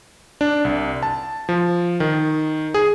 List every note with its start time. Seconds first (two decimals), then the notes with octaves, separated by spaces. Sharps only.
0.41 D4
0.65 C2
1.03 A5
1.49 F3
2.00 D#3
2.74 G#4